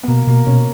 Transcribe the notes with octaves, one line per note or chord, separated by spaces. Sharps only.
B3
B2 A#3
B2 A#3
B2 C#4